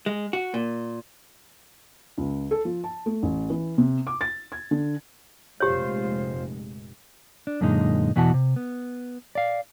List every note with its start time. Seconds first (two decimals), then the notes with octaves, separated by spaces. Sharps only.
0.06 G#3
0.33 F#4
0.54 A#2
2.18 C#2
2.51 A4
2.65 F3
2.84 A5
3.06 A3
3.23 A1
3.50 E3
3.78 C3
4.07 D6
4.21 A6
4.52 G#6
4.71 D3
5.60 F1 A#2 G#3 F4 G4 C5 C#5
7.47 D4
7.61 F#2 A#2 D3 G#3 D#4
8.16 E2 B2 E3 E4 F#4 A5
8.34 C3
8.56 B3
9.35 D5 F5